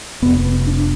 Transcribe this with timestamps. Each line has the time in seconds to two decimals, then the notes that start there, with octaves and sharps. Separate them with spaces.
0.22 F1 F2 C3 B3
0.45 B3
0.67 D4